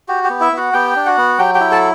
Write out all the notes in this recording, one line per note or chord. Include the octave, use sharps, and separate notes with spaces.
F#4 G4
G4
B3
E4 E5
B3 F#4 F#5
B3 G4 G5
D4
F#4 F#5
B3
F#3 G4 G5
G4 G5
E4
A4 A5